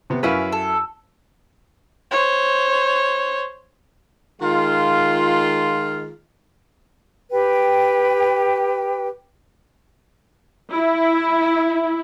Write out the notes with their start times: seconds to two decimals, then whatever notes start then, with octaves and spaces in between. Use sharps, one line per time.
0.10 C3 B3
0.23 F#2 C#4 E4 B4 F5
0.52 A4
2.11 C5 C#5
4.42 D#3 G#3 F4
7.31 G4 B4 G5
10.72 E4